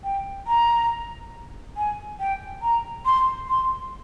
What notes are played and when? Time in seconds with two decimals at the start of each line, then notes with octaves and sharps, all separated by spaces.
0.04 G5
0.47 A#5
1.77 G#5
2.20 G5
2.62 A#5
3.06 C6
3.49 C6